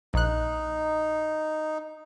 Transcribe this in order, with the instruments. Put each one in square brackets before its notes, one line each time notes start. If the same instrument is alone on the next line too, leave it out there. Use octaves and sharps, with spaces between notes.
[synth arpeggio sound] A#1 F#6 [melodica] D#4